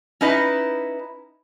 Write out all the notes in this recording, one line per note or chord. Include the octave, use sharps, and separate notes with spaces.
C#4 D#4 E4 B4 D#5